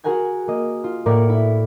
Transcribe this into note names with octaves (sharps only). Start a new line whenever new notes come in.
F#4 G#4 A#4 F#5 G#5 G#6
A#3 D#5
F4
A2 A#3 A#4 D5 F#5 C#7
E4